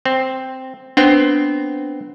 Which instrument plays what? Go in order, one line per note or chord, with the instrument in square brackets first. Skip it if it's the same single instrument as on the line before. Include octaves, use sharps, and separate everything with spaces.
[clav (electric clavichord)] C4
[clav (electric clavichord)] B3 C4 G5 [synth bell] D4